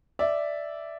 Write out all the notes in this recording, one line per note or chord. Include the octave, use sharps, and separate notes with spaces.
D5 E5